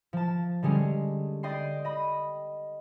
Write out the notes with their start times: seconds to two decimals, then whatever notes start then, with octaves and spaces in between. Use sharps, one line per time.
0.13 F3 A5
0.63 D3 G3 G#3 C#4
1.43 D5 D#5 G5 C6 C7
1.85 D#5 B5